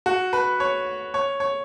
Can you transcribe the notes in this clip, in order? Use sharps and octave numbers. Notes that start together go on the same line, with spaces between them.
F#4
B4
C#5
C#5
C#5